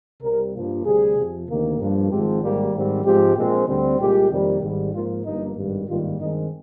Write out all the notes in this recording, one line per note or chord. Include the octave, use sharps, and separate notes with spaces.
C2 C3 G3 A#4
G2 F3 A#3
D2 C3 G3 G#4
F2 C3 F3
D2 C3 D#3 A#3
G2 F3 A#3
G#1 G#2 F3 G#3 C4 G4
G#1 G#2 G3 A#3 G4
G#2 D#3 G3 C4
G#2 F3 G#3 C4 G4
A#1 A#2 G#3 C4
D2 D3 G3 C4
C2 A#2 G#3 G4
F2 C3 D#3 G3 A#3
G#1 G#2 G3
G#2 F3 A#3 F4
G1 G2 F3 A#3 D#4
G#1 G2 D#3 G3
G#1 G2 D#3 G3 A#3 F4
G2 D#3 G#3 C4 D#4